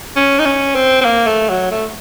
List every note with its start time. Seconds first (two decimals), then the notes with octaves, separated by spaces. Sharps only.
0.16 C#4
0.39 D#4
0.45 C#4
0.75 C4
1.01 C4
1.05 A#3
1.26 A3
1.49 F#3
1.71 A3